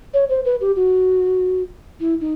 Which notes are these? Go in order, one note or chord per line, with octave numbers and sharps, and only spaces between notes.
C#5
C5
B4
G4
F#4
E4
D#4